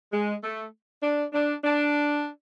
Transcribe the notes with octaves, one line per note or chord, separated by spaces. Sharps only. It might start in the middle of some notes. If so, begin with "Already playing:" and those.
G#3
A3
D4
D4
D4